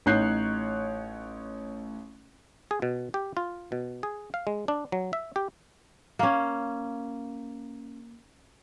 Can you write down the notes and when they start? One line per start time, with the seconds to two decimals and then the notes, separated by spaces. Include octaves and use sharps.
0.06 A1 D#4 C#5 F#6 G6 C7
2.71 G#4
2.82 B2
3.14 G4
3.37 F4
3.72 B2
4.03 G#4
4.34 F5
4.47 G#3
4.68 D4
4.92 F#3
5.13 E5
5.36 G4
6.19 A#3 C#4